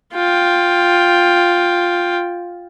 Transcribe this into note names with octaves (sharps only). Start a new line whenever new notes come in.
F4 G5